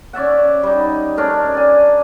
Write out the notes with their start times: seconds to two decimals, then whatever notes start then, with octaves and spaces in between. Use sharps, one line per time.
0.13 C#4 D5 E5 F#5
0.63 G3 D#4
1.17 C#4 D4 A#4
1.54 D5 G#5